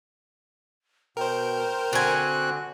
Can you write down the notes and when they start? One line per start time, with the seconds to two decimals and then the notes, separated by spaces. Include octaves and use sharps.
1.17 B2 A#4 C5 G5
1.93 D3 C4 F#4 G#5 F#6